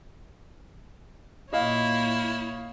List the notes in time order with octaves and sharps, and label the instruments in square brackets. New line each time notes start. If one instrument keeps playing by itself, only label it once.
[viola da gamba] A#2 A#3 C#5 [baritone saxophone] E4 [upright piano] D#5 F5